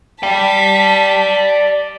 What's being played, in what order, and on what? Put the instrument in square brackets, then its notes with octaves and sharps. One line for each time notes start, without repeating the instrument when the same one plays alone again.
[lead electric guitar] D5 G5 [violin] A5 B6